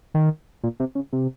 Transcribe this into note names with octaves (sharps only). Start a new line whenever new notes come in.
D#3
A#2
C3
C#3
C3